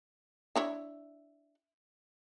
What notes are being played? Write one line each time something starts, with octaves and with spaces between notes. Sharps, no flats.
D4 E4 C#5